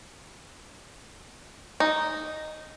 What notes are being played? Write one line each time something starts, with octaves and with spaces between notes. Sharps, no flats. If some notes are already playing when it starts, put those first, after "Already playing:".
D#4